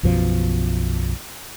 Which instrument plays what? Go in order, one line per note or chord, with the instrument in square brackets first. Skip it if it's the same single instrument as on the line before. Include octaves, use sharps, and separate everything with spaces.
[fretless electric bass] B1 F#2 B2 F3